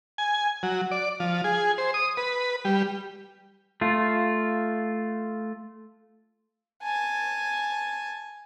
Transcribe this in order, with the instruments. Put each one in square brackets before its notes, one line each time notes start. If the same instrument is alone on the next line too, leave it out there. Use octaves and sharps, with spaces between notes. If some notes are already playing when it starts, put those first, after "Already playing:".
[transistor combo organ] G#5
F#3
D5
F3
G#4
C5
D#6
B4
G3
[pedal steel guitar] A3 F4
[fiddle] G#5 A5